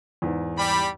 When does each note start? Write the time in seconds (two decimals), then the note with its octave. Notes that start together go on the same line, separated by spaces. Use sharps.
0.22 E2 G#2
0.58 G3 B5